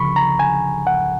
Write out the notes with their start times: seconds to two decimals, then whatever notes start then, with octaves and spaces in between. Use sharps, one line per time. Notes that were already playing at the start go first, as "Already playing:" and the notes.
Already playing: C#2 C#3 F3 B5 C#6
0.16 A#5
0.39 G#5
0.87 F#5